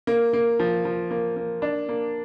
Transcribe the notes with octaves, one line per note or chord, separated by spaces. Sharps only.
A#3
A#3
F3
F3
A#3
A#3
D4
A#3